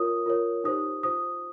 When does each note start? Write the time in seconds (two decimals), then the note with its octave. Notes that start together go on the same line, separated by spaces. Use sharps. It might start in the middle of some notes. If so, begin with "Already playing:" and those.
Already playing: F4 A#4 C#5 D#6
0.26 F4 A#4 C#5
0.64 D#4 G4 C5 D#6
1.03 F4 C5 D#6